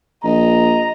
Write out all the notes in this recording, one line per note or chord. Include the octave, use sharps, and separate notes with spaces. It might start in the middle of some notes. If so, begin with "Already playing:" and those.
A#1 D#5 A#5